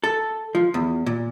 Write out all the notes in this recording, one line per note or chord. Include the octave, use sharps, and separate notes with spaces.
A4
F3
E2
A#2